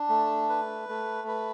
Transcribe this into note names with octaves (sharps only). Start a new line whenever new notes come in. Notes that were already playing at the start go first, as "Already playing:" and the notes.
Already playing: D4
A3
B4
A3
B4